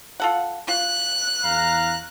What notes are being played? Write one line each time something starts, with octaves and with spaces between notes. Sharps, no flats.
F4 A4 F#5
F4 F#6
E2 F5 A#5